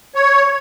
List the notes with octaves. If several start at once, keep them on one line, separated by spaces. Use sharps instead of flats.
C#5